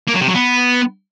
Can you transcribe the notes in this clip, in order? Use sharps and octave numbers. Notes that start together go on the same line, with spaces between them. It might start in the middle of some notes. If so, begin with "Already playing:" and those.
A#3
F#3
C3
F#3
B3